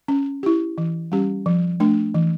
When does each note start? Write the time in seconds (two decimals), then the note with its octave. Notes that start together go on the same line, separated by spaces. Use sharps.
0.08 C#4
0.43 E4 G4
0.78 E3
1.12 G3 C#4 G4
1.46 F3
1.80 A3 D4
2.14 E3